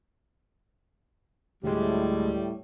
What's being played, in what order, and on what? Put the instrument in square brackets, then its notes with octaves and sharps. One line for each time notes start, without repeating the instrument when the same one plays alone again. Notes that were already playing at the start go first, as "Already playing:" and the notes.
[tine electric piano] D2 G#3 [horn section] A2 G3